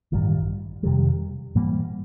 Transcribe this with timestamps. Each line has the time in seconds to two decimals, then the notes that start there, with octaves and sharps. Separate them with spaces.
0.12 A1 G2 D#3 G3
0.83 F2 C3 D#3 G3
1.55 G#2 E3 G3 A#3